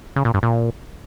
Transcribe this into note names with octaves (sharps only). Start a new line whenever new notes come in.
C#3
A#2
G2
A#2